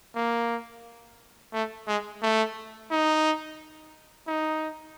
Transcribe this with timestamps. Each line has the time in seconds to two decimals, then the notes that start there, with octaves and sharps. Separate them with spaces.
0.16 A#3
1.53 A3
1.87 G#3
2.22 A3
2.91 D#4
4.27 D#4